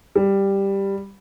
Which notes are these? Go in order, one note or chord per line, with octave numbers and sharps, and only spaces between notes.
G3